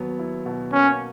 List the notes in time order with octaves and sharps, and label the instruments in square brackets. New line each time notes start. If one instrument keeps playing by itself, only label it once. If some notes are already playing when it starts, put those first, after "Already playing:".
Already playing: [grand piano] D#2 F#3 B3
E4
B2
[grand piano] A#3 [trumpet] C#4